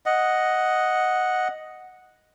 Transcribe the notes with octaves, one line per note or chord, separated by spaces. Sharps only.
D#5 F#5